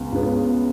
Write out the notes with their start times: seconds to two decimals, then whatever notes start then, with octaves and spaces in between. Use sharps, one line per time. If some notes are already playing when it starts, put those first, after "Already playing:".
Already playing: C#2 C#3 G#3 B3
0.12 C#2 C#3 G#3 B3